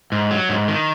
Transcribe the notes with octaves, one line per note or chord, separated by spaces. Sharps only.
G#2
F#3
G#2
D#3